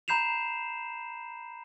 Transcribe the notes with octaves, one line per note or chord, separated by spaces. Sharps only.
A#5 B5 G6 C7 E7 F7